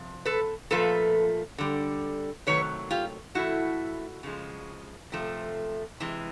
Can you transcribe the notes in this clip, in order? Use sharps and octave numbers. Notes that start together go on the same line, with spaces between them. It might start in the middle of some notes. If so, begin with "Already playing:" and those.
Already playing: C3 F3
A4 B4
A#2 F3 A3 A4 B4
D3 G3
C3 D#3 F#3 A3 B4 C#5
F4 G4
A2 E3 A3 E4 F#4
C#3 F3 G#3
C3 F3 A3
C3 E3 G#3